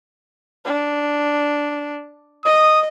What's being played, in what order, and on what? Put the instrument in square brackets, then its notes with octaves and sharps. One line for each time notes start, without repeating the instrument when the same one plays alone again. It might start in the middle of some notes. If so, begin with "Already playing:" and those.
[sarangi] D4
[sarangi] D#5 [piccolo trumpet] D#6